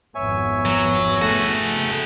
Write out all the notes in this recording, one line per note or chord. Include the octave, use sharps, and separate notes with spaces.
G#1 F2 B3 C#5 E5 G#5
F#3
A3 F#4 G#4